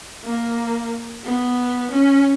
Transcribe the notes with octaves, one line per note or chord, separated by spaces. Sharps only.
A#3
B3
C#4